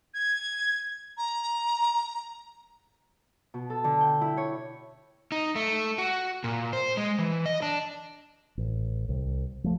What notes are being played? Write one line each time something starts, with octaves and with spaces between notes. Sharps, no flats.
G#6
A#5
B2
A4
D3
G5
E4
C#5
D#4
A3
F#4
A#2
C5
G#3
E3
D#5
D4
A1
C2
F3 A3